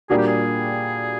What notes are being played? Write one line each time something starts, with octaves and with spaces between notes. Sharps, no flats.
A#2 G3 A#3 D4 F#4 G#4
G4
G#4